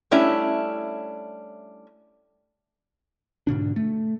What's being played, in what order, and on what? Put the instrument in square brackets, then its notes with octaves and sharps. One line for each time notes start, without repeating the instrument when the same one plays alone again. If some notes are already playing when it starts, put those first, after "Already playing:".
[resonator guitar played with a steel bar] G3 A3 C#4 D4 E4
[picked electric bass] G#2 B2 D3 D4
A3